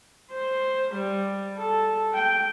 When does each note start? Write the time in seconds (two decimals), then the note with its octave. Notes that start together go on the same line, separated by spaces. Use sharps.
0.32 C5
0.94 G3
1.58 A4
2.14 G5